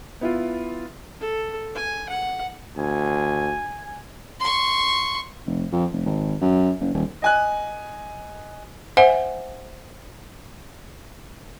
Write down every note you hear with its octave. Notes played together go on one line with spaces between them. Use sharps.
B3 E4 F4
A4
G#5
F#5
D2 G#5
C6 C#6
F1
F2
F1
G#1
F#2
F#1
D#1
D#5 G#5 F#6
C5 E5 F#5 G#5